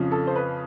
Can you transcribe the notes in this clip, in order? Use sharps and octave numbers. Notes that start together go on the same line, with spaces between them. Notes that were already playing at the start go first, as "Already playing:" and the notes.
Already playing: F2 C#3 F3
A4
C5
B4